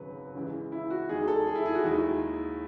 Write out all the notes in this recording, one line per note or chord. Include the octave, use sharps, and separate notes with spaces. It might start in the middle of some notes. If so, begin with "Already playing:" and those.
Already playing: G#1 F#2 C#3 F#3 B4
C#2 C#3 E3 G#3
E4
F#4
E2 D#3 G#3 G#4
G#4
A4
G#4
E4
G#4
F#4
D#2 D#3 G#3 E4